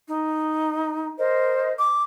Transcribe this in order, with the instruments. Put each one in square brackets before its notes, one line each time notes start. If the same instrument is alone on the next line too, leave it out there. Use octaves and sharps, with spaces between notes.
[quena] D#4
[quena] A#4 [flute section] C5 D#5
[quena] D6